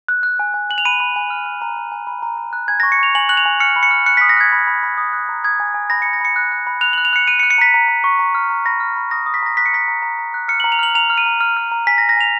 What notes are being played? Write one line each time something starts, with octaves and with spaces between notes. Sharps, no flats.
F#6
F#6
G#5
G#5
G#5 F#7
F7
B5 D#7
B5
G#5
F6
F6
A#5
G#5
G#5
B5
A#5
A#5
F#6
G#5 G#6
C#6 A#6
C#7
C#6 F7
G#5 F#7
F#6 F#7
F7
G#5
F6 C#7
B5
C#7
F6
F#6 C#7
D#6 B6
A#6
F#6 G#6
B5
B5
B5
D#6
F#6
A#5
D#6 G#6
G#5
G#5
B5 A#6
B5 C#7
A#6
B5 C#7
F#6
F#6
B5
F#6 F7
F#6 F#7
F7
F#6 C#7
F#6 D#7
C#7
F#6
C#7
A#5 B6
A#5
A#5
C#6
A#5
F6
A#5
B5 A#6
F6
B5
D#6 A#6
D#6
B6
A#5 A#6
F#6 B6
C#7
A#5 B6
A#5
A#5
A#5
F#6
F6 C#7
A#5 F#7
F7
F6 F#7
A#5 F7
F6
D#7
A#5
F6
F6
A#5
G#5 B6
A#6
G#5
A#6
G#5 F7